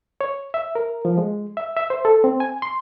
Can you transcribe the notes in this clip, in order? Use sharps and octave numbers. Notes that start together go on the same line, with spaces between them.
C#5
E5
A#4
F3
G#3
E5
E5
C5
A4
C4
G#5
C6